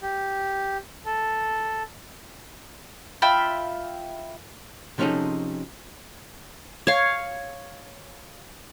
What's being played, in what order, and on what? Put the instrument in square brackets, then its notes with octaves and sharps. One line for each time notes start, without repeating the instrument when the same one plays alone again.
[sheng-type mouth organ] G4
A4
[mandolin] F4 E5 G5 B5
[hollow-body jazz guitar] C3 F3 C#4 D#4 G#4 A4
[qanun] C#5 F5